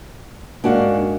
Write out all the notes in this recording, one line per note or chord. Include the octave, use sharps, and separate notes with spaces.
G#2 A#3 C#4 D4 F#4 F5